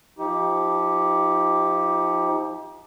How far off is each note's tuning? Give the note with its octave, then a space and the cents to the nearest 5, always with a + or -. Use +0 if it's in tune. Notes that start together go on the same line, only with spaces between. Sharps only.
F3 +0 D#4 +35 G4 +0